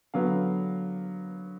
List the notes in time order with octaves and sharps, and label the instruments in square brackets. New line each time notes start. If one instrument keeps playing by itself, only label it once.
[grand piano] D3 F#3 B3 F5